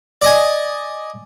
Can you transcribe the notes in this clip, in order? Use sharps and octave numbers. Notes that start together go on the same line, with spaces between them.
D5 D#5 G#5